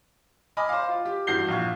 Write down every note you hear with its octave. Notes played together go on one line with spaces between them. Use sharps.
D#5 G#5 B5 D6 F6
C5 F5
F4
G4
G2 E3 F#4 G6 C7 G7
A#1 F5 C#6 G#6